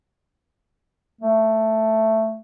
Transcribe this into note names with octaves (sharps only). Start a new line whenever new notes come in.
A3